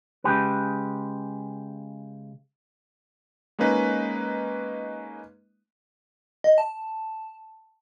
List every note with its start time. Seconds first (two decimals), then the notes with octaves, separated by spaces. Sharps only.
0.24 C#3 G#3 G4 B4
3.59 G#3 A#3 C#4 D#4 B4
6.44 D#5
6.58 A5